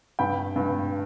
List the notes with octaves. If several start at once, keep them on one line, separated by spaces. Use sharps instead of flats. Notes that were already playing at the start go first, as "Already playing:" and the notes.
G2 G5 B5
G2